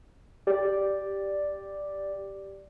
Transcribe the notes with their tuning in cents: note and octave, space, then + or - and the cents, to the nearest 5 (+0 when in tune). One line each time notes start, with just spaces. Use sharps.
G4 +0 D5 +0